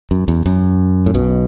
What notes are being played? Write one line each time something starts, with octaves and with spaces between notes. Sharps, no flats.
F#2
E2
F#2
A2
B1 B2